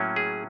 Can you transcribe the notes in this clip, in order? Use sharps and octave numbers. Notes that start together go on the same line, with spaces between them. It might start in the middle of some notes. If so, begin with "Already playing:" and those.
Already playing: A2 F#3 A#3 C#4
G#4